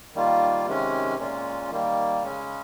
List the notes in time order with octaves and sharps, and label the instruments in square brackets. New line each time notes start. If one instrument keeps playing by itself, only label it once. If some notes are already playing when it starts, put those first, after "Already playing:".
[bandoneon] D#3 G3 A#3 F4
C3 D#3 G#3 C#4
A#2 G#3 C#4 F4
D#3 G3 A#3
C#3 G#3 C#4